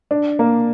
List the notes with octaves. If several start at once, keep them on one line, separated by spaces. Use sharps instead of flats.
D4
A#3